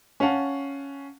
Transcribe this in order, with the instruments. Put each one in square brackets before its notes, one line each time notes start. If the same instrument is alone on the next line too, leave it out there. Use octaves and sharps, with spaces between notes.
[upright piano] C#4 F5 F#5 A5